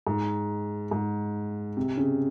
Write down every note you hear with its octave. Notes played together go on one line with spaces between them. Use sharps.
G#2
G#2
C3
C#3